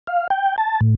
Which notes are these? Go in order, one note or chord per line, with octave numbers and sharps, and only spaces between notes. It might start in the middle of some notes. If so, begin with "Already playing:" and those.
F5
G5
A5
A2